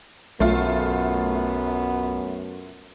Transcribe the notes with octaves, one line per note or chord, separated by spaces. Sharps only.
B1 F#2 A3 B3 F4